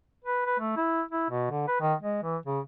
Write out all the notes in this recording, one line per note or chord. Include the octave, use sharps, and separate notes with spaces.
B4
B4
A3
E4
E4
B2
D3
B4
D#3
G#3
E3
C#3